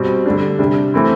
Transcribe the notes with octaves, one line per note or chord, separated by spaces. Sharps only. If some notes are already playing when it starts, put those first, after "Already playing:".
Already playing: B2 G3 C4
D3 G3 D4
C3 G3 D4
E3 A3 C4 E4